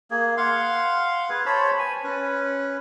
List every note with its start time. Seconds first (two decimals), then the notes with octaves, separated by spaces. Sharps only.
0.11 A#3 G#4
0.37 F5 F#5 C6
1.29 G#4 B4
1.46 C5 C#5 A5 B5
1.79 G#5
2.04 C#4 B4